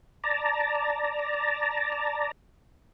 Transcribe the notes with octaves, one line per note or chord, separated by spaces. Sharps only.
D5 A5 A#5